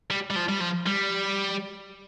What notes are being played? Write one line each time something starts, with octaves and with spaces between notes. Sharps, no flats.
G3
G3
F3
G3
F3
G3